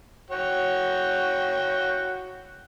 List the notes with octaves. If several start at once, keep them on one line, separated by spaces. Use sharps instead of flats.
F#4 C#5 G5